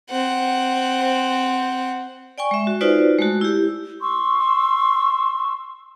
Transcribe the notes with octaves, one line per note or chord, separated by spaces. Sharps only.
C4 F#5
D5 G5 G#5 C#6
G#3 E5
F#4
D#4 F4 F#4 B4 C5 D5
G#3 A3 F#4
E4 G4
C6 C#6 E6